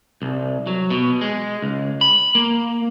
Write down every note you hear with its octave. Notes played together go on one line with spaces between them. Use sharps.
C2
F#3
B2
G#3
C#2
B5
A#3